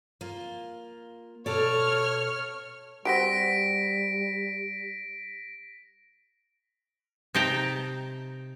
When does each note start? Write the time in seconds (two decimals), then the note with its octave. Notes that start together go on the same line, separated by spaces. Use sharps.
0.21 A#3 F4
1.46 B2 A4 C#5 D5 F6
3.05 G3 C4 F#4 G4 A#6 B6 D7
7.35 C3 D#4 G5 A5 A#5